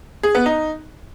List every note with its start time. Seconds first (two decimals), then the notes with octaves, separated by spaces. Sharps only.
0.23 G#4
0.35 B3
0.46 D#4